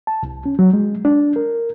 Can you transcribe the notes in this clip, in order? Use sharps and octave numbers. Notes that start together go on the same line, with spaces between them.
A5
C2
C#4
F#3
G#3
D4
A#4